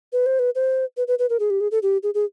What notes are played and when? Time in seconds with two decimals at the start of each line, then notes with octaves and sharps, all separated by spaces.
0.13 B4
0.26 C5
0.39 B4
0.55 C5
0.97 B4
1.08 B4
1.19 B4
1.30 A#4
1.40 G#4
1.50 G4
1.60 G#4
1.71 A4
1.83 G4
2.03 G#4
2.14 G#4